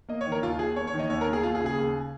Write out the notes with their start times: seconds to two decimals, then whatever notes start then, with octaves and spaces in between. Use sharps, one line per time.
0.09 A#3 D#5
0.21 C#5
0.27 D#3
0.32 A#4
0.42 D#2 F4
0.59 D#2 G#4
0.76 A#3 C#5
0.87 C#5
0.94 D#3
0.99 D#5
1.09 D#2 C#5
1.21 A#4
1.27 D#2
1.33 G#4
1.43 A#3 F4
1.55 G#4
1.60 C#3
1.66 G#4
1.77 D#2